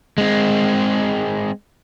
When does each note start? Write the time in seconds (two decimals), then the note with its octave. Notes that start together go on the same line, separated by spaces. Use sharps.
0.18 G#3 C4